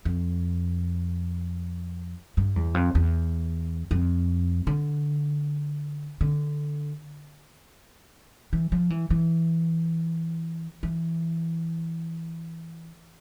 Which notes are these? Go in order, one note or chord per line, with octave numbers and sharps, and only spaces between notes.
F2
G2
E2
F2
E2
F2
D3
D3
E3
F3
E3
E3
E3